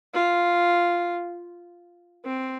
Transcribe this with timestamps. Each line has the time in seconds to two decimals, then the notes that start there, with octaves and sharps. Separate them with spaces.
0.14 F4
2.25 C4